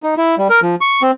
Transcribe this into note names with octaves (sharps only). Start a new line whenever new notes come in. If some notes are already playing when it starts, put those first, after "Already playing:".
D#4
E4
G3
A#4
F3
C#6
C4